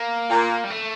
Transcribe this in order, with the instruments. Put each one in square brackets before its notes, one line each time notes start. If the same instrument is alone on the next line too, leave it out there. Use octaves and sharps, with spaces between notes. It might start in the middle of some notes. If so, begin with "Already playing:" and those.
Already playing: [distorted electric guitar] A#3
[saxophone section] A#2
[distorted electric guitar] G3
A3